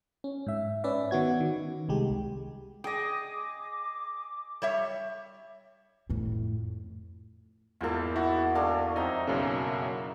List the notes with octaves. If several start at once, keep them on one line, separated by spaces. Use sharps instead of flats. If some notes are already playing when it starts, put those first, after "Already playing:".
C#4
G#2 E5
C#4 B4 D5 E5
D#3 B3 F#4 G#6
D#3
C2 G#3 G4
G#4 D#5 G5 D6
G3 C#5 E5
F2 A2
E2 G#2 A#3 F4 A4
E4 F#4
G#3 D4 A4 F5
F2 C4 D#4 E4 A#5
B1 F#2 C#3 A#3